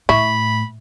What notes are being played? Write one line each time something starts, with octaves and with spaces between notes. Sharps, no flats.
A2 E4 B5 C#6